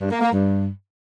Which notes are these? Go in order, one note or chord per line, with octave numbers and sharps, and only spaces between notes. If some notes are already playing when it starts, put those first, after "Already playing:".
G2
A#3
A#3
G2